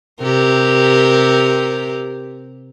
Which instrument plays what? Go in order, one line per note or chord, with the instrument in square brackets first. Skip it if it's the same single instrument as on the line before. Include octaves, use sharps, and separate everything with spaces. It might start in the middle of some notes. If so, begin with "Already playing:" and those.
[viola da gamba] C3 G4 A#4